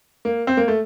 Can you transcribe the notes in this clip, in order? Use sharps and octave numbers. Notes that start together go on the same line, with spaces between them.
A#3
C4
A#3
A3